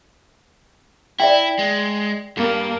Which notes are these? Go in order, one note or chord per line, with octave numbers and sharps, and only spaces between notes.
E4 D5 E5 G5
G#3
G2 A#3